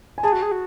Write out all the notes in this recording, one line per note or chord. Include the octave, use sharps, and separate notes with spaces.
G#5
G#4 A5
F#4
G#4
F#4